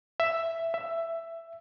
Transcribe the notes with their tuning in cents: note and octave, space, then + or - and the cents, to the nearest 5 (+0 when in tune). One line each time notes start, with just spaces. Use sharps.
E5 +5
E5 +10